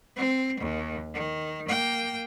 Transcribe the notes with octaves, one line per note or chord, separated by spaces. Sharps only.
C4
D#2
D#3
A#3 G5